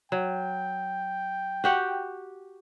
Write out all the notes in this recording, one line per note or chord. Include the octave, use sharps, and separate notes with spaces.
F#3 G5
F#4 G4 F#5